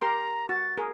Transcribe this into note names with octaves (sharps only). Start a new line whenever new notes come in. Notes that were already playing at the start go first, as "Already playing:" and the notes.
G4 A#4 A#5 C6
F#4 A6
G#4 A#4